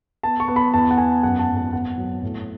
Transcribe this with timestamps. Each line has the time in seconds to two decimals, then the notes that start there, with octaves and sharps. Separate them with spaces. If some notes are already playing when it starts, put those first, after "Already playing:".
0.23 B3 A5
0.40 C#6
0.48 B3
0.56 B5
0.74 E2 A5
0.91 F#5
0.98 E2 G#5
1.23 F#2 F#5
1.39 A5
1.48 G#1
1.57 A5
1.73 B3 F#5
1.98 F#3
2.22 A2